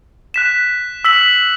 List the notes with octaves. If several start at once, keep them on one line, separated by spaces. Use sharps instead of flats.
F#6 B6 E7
E6 B6 F#7